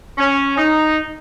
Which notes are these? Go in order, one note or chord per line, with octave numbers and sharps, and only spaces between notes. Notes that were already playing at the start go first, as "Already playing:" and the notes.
C#4
D#4